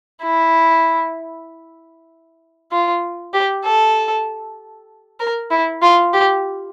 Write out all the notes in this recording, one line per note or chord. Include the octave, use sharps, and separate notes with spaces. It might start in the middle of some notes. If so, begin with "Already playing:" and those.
E4
F4
G4
A4
A#4
E4
F4
G4